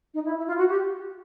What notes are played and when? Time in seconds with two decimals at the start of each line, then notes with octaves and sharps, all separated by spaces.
0.14 D#4
0.25 E4
0.36 E4
0.47 F4
0.57 F#4
0.68 G4